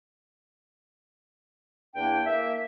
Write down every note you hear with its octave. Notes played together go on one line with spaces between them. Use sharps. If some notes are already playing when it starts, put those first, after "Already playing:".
E2 A#3 D4 E4 G5
A#3 E5